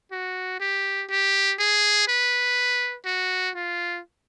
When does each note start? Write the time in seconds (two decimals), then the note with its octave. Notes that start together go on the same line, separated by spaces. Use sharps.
0.12 F#4
0.61 G4
1.10 G4
1.59 G#4
2.08 B4
3.06 F#4
3.56 F4